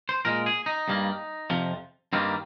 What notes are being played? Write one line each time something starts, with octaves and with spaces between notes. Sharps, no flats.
C5
A#2 G#3 A#4
G#4
D#4
G2 G3 A#3
F2 C3 F3
G2 D#3 G3 A#3 C4